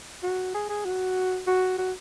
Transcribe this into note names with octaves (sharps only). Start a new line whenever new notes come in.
F#4
G#4
G#4
F#4
F#4
F#4